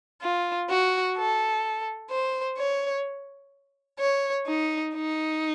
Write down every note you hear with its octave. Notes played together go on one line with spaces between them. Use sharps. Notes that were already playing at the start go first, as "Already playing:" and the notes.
F4
F#4
A4
C5
C#5
C#5
D#4
D#4